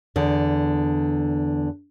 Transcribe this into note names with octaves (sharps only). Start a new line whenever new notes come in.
E2 D3